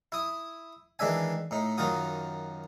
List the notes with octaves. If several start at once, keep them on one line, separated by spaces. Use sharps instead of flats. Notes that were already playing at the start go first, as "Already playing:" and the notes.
E4 D#6
D#3 E3 G#3 D4 E5 G#5
A2 D#4
F#2 D#3 D#4 F4 F#4 D#6